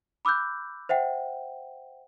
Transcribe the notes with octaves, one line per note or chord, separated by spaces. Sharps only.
B5 D6 E6 F#6 G6
C5 E5 F#5 G5